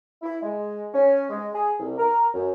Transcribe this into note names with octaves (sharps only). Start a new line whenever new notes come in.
E4
G#3
C#4
G#3
G#4
C2
A#4
F#2